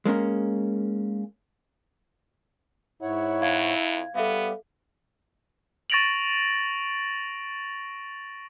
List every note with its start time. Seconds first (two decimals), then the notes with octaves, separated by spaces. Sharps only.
0.05 G#3 A#3 C#4 A#4
3.02 G#2 E4 C#5 F#5
3.42 F2 F5 G#6
4.15 G3 B3 G4 A4 E5 F5
5.90 C#6 A6 A#6 D7 F7 F#7